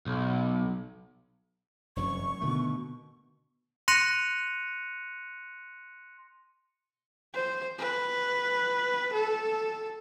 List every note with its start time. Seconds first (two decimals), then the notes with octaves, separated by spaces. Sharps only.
0.06 B1
1.96 F1 F#2 E3 C#6
2.41 B2 D3 D#3 A3
3.88 C6 F#6 A#6 C#7 D#7 F7
7.34 C5
7.79 B4
9.13 A4